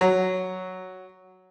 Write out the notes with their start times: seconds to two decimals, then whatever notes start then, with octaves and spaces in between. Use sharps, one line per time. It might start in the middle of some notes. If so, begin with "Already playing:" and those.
0.01 F#3